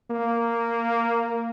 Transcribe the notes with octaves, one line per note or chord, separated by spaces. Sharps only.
A#3